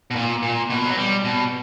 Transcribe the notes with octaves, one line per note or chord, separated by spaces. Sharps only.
B2
A#2
A#2
B2
F#3
G3
B2